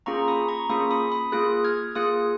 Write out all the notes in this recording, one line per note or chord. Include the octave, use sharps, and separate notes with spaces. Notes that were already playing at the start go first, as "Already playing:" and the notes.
A#3 C#4 F4 G#4 A#5 C#6
B5 D#6
A#5 C#6
A#3 C#4 F4 G#4 B5 D#6
B5 D#6
B5 D#6
A#3 F4 G#4 D#6 F#6
F6 G#6
A#3 F4 G#4 D#6 F#6